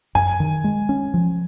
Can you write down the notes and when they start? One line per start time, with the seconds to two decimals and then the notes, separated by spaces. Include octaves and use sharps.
0.15 F#2 G#5
0.40 D#3
0.64 G#3
0.89 C#4
1.14 F3